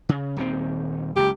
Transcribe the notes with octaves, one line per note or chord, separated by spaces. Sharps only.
C#3
D#1 D#3 C4
F#1 C#2 G4